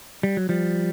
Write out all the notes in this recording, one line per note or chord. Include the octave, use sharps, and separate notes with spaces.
G3
F#3
F3 G3